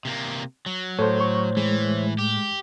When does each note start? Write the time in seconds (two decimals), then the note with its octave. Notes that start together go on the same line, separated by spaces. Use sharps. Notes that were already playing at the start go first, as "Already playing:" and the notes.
0.05 C3 A#3
0.66 F#3
0.99 A2 A4 C5 C#5
1.21 C#6
1.57 E3 G#3
2.19 G4